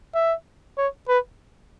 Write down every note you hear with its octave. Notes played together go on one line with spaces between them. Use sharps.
E5
C#5
B4